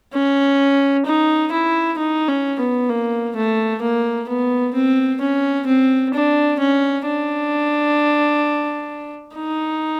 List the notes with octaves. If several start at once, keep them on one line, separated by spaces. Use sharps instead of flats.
C#4
D#4
E4
D#4
C#4
B3
A#3
A3
A#3
B3
C4
C#4
C4
D4
C#4
D4
D#4